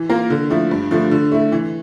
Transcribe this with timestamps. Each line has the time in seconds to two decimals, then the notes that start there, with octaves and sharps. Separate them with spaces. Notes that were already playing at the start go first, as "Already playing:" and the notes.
Already playing: E3
0.09 A#3 F4 A#4
0.30 D3
0.50 F3 A3 E4
0.71 G2
0.91 D3 F3 A3
1.11 D3
1.32 A3 E4
1.52 E3